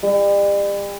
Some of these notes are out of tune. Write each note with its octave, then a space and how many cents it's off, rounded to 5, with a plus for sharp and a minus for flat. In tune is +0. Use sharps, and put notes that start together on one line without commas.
G3 +40